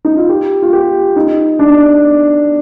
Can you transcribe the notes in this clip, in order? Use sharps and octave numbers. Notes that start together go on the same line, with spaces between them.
D#4
F4
G4
F4
G4
D#4
D4